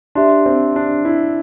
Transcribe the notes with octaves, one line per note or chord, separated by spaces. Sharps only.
D4 G4 E5 C6
C4
D4
E4